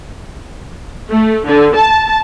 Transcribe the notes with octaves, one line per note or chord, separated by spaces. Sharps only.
A3
D3
A5